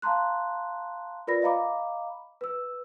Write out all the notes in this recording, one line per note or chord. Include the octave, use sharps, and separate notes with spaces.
F5 A5 A#5 C6 F#6
F4 A#4 B4 D5 B5 A#6
D#5 F5 A#5 B5 D6
B4 E6